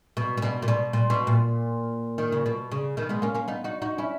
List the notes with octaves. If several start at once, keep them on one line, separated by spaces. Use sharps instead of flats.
B2
A#2
B2
A#2
B2
A#2
B2
A#2
D#3
C#3
B2
C#3
B2 D#3
G#3 B3
A#3 C#4
A#3 C#4
B3 D#4
D#4 F#4
D#4 F#4
C#4 E4